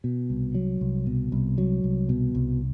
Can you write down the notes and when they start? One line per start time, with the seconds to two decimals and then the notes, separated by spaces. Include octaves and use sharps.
0.04 B2
0.30 C2
0.55 F#3
0.81 C2
1.06 B2
1.32 C2
1.58 F#3
1.84 C2
2.09 B2
2.35 C2